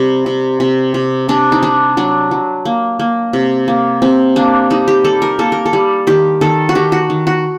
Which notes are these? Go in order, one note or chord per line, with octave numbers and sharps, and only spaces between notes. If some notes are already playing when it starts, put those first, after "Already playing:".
Already playing: C3 G3
C3
C3
C3
C3 D4
D#4
G3 D4
F#3 D4
F#3
A#3
A#3
C3
A#3
C3 C4
A#3 D4
G3 D#4
G4
G3 A4
A#4
A#3 A4
A#4
A4
G3
D#3 G4
D#3 A4
F#4
D#3 G4
F#4
D#3
F#4